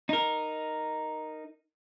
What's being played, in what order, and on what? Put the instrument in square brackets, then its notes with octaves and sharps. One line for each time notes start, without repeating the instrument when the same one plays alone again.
[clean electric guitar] D#4 A#4